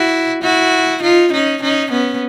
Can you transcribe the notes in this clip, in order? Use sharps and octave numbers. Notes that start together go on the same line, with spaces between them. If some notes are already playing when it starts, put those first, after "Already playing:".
Already playing: E4 F#4
E4 F#4
D#4 F4
C#4 D#4
C#4 D#4
B3 C#4